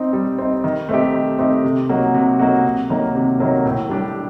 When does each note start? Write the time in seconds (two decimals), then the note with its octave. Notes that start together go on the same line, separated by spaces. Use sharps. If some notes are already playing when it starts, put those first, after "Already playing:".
Already playing: C4 D#4
0.13 G3
0.38 C4 D#4
0.64 D#3
0.89 A3 C4 D#4 G4
1.14 D#3
1.39 A3 C4 D#4 G4
1.64 C3
1.89 F#3 A#3 D#4 F#4
2.14 C3
2.39 F#3 A#3 D#4 F#4
2.65 C3
2.90 D#3 F#3 A#3
3.15 C3
3.40 D#3 F#3 A#3
3.65 A2
3.89 G3 D4 G4